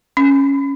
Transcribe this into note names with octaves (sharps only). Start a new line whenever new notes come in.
C#4